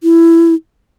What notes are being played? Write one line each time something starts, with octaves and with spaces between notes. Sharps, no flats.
E4